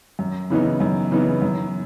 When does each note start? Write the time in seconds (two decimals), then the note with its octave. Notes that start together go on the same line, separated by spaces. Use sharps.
0.19 F#2
0.50 C#3 E3 B3 D#4
0.80 F#2
1.11 C#3 E3 B3 D#4
1.42 F#2